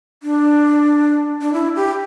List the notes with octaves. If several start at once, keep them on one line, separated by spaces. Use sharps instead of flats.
D4
D4
E4
G4